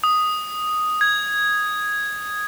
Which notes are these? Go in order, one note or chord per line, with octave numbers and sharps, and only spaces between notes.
D#6
G#6